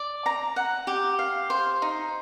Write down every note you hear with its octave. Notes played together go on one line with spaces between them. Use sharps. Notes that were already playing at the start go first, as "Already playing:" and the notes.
Already playing: D5
A#5
F#5
G4
F5
C5
D#4